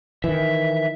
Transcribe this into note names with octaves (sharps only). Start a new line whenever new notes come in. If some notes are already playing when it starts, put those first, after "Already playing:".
D#3 E3 E5